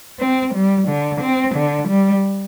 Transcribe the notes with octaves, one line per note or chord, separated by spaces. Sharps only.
C4
G3
D3
C4
D3
G3